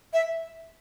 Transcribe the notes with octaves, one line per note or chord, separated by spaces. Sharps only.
E5